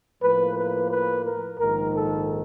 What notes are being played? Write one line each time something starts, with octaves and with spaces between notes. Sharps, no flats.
A2 F3 A#3 B4
B4
B4
A#4
A#1 G#2 D#3 A#4
A4